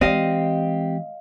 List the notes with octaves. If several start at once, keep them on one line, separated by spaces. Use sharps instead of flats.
E3 G#3 C4 G4 D#5 F5